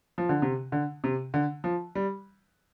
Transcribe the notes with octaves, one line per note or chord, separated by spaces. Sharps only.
F3
D3
C3
D3
C3
D3
F3
G3